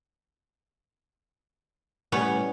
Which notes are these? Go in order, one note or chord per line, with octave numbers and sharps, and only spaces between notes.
A2 G3 B3 C#4 C#5